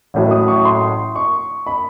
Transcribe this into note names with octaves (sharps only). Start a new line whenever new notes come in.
A1 A2 F#3
D#6
C#6
C6
C#6
B5